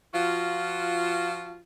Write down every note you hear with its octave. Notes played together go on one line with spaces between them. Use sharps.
F3 F4 F#4